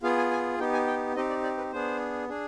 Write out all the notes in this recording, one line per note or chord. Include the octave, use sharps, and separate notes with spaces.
B3 F4 G#4 F5
G#5
G#5
B3 D#4 G4 G5
G#5
G5
C4 D#4 G4 D#5
D5
D5
B4
B3 D4 G#4 C5
D4 G#4